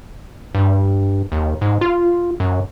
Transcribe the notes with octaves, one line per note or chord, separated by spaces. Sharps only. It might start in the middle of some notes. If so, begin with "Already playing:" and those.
G2
D#2
G#2
F4
F#2